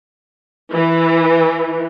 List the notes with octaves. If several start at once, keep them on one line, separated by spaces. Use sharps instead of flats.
E3